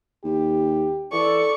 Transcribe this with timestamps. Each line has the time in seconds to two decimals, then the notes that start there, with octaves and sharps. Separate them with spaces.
0.24 D#2 G4
1.13 E3 A4 D5 C#6